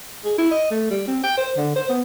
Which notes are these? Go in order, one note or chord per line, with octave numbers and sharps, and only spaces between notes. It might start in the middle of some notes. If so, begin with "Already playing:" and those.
G#4
E4
D#5
A3
G3
C4
G5
C5
D3
C5
B3